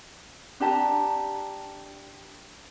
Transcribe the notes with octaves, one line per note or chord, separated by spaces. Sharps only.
D4 G4 A5 A#5